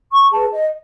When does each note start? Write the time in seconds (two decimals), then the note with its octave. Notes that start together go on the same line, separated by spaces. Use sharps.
0.13 C#6
0.32 G#4 B4 A5
0.52 D#5